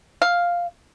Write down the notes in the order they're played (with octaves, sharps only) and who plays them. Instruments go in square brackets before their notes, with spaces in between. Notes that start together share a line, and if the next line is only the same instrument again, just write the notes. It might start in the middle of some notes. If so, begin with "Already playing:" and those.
[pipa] F5